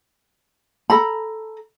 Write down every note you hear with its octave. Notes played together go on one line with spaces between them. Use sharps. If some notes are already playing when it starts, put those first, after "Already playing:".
A4 A#5 B5